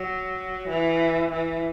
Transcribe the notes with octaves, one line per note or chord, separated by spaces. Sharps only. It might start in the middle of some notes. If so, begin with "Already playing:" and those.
Already playing: F#3
E3
E3